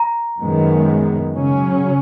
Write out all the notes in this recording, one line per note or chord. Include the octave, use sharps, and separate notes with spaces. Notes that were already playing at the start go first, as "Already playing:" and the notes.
Already playing: A#5
F#2 D#3 G#3 B3
C#3 F#3 C#4